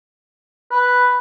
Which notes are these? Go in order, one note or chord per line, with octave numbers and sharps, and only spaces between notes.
B4